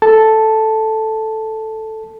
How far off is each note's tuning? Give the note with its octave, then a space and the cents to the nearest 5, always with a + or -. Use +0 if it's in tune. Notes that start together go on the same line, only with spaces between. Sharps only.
A4 +0 A5 +0